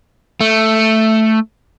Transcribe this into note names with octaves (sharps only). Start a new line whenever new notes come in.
A3